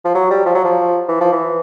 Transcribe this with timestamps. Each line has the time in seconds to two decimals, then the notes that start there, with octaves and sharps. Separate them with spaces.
0.04 F3
0.15 F#3
0.30 G3
0.46 F3
0.55 F#3
0.64 F3
1.08 E3
1.20 F3
1.32 E3